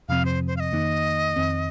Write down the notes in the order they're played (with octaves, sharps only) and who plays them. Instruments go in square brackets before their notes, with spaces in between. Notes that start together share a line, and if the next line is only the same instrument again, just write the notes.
[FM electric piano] F2 C3 F3 C4 [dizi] F5
[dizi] C5
C5
F5
D#5
[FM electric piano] F2 D#3 A#3 D#4
F2 D#3 C4